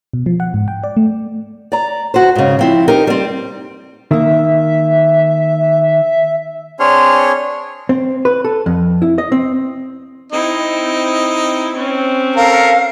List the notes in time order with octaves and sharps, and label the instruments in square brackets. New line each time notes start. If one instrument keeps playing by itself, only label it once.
[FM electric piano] B2
F3
F#5
G#2
G5
D5
A3
[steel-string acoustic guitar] D5 A#5
F#4 C5
G#2 C#3
F3 C4 E4
D#4 G4 A#4 C5
G3 C4
[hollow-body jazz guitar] D#3 A#3 [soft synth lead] E5
[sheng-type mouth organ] C4 D4 G#4 C#5 C6 F6
[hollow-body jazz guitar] C4
B4
A4
F2
E4
D#5
C4
[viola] C4 E4 [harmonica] D#4
[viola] C4 C#4
[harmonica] A4 A#4 [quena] F5